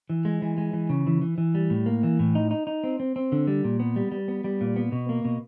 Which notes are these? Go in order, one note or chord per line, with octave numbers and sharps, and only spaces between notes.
E3
G#3
E3
G#3
E3
C#3
E3
E3
E3
G3
A2
A#3
E3
A2
D#4
D#4
D#4
C4
C4
C4
D3
G3
A#2
B3
G3
G3
B3
G3
A#2
B3
B2
A#3
B2